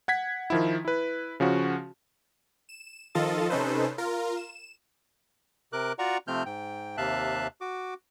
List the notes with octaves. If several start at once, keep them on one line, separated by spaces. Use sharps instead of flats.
F#5 G#6 B6
D#3 F3 E4
E4 B4
C#3 F3 C#4 F#4
E7
D#3 F3 F4 A4 D#5 A6
C3 C#4 D#4 A4 B4 C5
F4 A#4
E7
C3 A#4 D6 F#6
F4 F#4 D5 F#5 A#5 C#6
C3 F3 A3 C4 F6 G6
G#2 G5
D#2 C3 E5 F5 A5 F#6
F#4 D6